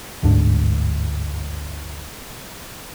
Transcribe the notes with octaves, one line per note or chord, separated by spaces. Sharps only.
G1 D2 G#2 D4